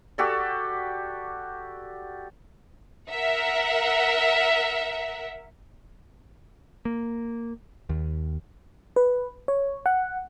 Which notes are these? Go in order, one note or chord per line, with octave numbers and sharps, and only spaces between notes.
F#4 G4 A4 D5
A#4 E5 F#5
A#3
D#2
B4
C#5
F#5